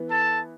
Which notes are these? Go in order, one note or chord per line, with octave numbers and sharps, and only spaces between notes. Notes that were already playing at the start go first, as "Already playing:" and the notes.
Already playing: E3 B3
A4 A5